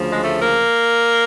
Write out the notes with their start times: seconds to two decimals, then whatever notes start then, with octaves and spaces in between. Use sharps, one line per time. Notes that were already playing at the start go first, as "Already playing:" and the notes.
Already playing: D2 C#3 F3
0.09 G#3
0.24 A3
0.41 A#3